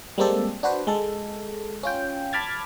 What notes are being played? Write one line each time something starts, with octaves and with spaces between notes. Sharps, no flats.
G3 G#3 A#3 C4 G4 A4
D4 F#4 B4 C5
G#3 A4
C#4 F4 G5
A5 B5 D6 F6 G#6 A6